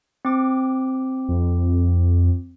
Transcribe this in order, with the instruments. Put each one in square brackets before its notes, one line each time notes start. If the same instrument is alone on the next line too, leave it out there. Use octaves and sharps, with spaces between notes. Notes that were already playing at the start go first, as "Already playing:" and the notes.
[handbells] C4 D6
[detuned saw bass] F2